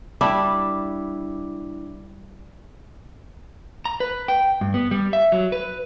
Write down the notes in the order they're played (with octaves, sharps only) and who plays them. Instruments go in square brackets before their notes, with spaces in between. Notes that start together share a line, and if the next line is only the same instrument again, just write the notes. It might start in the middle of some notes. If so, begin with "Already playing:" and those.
[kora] G3 D4 E4
[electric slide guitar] A#5
B4
G5
G2
B3
G3
E5
F#3
B4